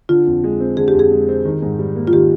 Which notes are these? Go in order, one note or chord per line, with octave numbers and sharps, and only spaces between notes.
D3 F4
F2
G#3
C4
D3 G#4
G4
F2
G#4
G#3
C4
D#3
G#2
G3
A#3
F4
D#3 G4